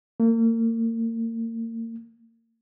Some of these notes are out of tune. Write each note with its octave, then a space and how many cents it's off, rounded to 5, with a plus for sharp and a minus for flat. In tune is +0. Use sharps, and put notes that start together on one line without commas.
A#3 -35